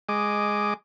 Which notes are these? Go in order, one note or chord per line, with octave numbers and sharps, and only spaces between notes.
G#3 D#5 D6